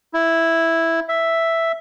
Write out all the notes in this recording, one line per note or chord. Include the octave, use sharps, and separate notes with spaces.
E4
E5